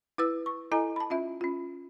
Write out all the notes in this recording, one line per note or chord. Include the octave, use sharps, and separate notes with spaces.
E4 B4 E6
C#6
E4 A4 D#5 G#5 A#5
A5 B5
C#4 F4 E5
C#4 F4